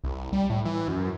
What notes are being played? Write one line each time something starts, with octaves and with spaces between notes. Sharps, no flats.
C2
G3
A2
E3
F#2